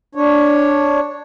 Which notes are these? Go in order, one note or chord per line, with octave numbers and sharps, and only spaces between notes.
D4 C#5